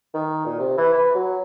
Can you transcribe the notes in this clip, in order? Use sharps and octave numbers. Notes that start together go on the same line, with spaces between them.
D#3
A#2
C3
E3
B4
F#3